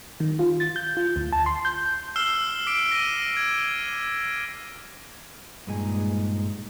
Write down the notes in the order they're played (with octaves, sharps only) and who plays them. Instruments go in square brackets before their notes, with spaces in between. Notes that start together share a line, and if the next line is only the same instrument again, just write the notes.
[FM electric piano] D#3
F4
A6
G6
F4
D2
A5
C6
G6
[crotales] E6 F6 C7 E7 G7
D6 B6 D7
A#6 D#7
G#6
[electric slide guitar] G2 A#2 G#3 D#4 G#5